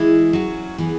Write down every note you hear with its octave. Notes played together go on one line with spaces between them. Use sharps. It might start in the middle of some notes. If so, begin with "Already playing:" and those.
Already playing: E3 G#3 E4
F#3 C#4 F#4
E3 B3 G#4